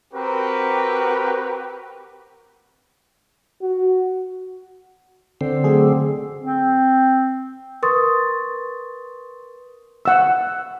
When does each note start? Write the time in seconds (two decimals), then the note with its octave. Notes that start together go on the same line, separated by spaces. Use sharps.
0.13 C4 F#4 G4 A#4 B4
3.62 F#4
5.41 D3 C4
5.64 F#3 A3 G#4
6.41 C4
7.83 A#4 B4 C6 C#6 D#6 A6
10.05 F#5 E6